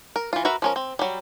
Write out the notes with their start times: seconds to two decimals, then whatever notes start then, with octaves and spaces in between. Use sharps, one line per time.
0.16 A#4
0.33 E3 F4
0.45 F#4 A#4 B4 E5
0.62 F3 C#4 A#4
0.76 C4
0.99 F#3 G3